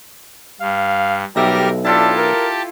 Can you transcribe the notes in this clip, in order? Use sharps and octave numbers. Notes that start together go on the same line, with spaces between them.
G2 F5
B1 G3 G4 A#4 E5 A#6
D4 E4 F4 G4 A4 A5
A#4